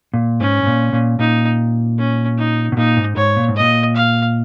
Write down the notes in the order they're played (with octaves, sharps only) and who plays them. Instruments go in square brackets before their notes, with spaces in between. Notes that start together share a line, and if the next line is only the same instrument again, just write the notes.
[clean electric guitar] A#2
[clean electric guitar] G#2 [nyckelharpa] C#4
[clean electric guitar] G#2
A#2
A#2
[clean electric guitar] A#2 [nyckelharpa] D#4
[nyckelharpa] C#4
D#4
[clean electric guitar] B2
[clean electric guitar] A#2 [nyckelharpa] D#4
[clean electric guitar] G#2
[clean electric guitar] G#2 [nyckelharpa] C#5
[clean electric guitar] A#2
G#2
[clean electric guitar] A#2 [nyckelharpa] D#5
[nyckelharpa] F5